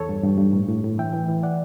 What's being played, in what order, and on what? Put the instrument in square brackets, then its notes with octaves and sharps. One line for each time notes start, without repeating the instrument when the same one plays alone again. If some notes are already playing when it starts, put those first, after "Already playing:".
Already playing: [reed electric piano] E2 A4 C#5
G2
G2
G2
A2
A2
A2
E3 E5 G5
E3
E3
E3 D5 F#5